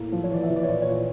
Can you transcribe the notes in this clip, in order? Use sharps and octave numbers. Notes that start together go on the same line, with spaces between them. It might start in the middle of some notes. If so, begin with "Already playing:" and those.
Already playing: A2 A#3
F3
C#5
E3 D5
E5
E3
D5
C#5
A#2 D5
C#5
A#2
C#5